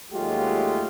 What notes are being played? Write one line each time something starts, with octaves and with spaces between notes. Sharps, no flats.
D#2 F#3 G#3 A3 F4 G4